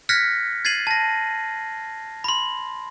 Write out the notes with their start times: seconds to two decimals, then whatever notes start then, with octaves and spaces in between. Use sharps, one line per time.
0.09 F6 F#6 G#6 A#6 B6 C#7
0.65 G#6 A6 C7 D#7 F#7
0.87 A5 A#6
2.24 B5 C6